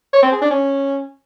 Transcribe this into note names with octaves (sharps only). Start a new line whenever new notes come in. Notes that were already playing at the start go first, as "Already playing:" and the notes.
C#5
C4
G#4
D4
C#4